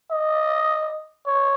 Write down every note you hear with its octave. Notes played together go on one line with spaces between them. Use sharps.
D#5
C#5